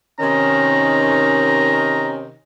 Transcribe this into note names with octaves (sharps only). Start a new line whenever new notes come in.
C3 D#3 C#4 A#5